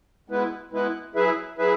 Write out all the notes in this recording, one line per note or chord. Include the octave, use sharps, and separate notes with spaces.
B2 G#3 B3 E4 B4
B2 G#3 B3 E4 B4
F#3 E4 G#4 B4 E5
F#3 E4 G#4 B4 E5